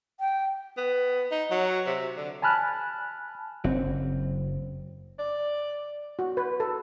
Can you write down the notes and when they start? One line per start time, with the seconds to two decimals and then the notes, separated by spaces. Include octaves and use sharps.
0.20 G5
0.77 B3
1.32 D#4
1.51 F#3
1.87 C3
2.17 D3
2.42 G#5 A5 B5 F6 F#6
3.64 F#1 F#3 C4 F#4
5.19 D5
6.19 F#4
6.37 B4
6.60 A4